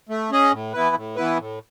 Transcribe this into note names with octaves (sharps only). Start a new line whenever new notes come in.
A3
C#4 G#4 D#5
A2
E3 B3 E4 B4
A2
E3 B3 E4 B4
A2